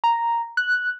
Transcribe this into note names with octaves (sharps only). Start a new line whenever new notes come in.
A#5
F#6